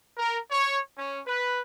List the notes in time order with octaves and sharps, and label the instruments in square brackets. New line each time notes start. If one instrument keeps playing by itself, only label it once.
[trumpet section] A#4
C#5
C#4
B4